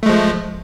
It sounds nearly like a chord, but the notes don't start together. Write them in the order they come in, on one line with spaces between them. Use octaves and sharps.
A3 G#3 F3